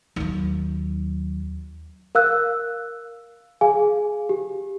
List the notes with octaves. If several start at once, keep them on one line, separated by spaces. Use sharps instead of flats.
D#2 F#3
A#4 F5 E6 F#6
G#4 F5 G#5
G4